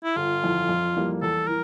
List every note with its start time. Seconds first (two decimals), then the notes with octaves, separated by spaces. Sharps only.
0.04 E4
0.16 G1 F4
0.43 F2 E3
0.69 F2
0.95 E3 G3 A#3
1.22 E2 A4
1.48 E3 A#4